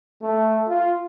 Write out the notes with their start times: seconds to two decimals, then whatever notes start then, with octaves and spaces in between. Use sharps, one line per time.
0.22 A3
0.68 F4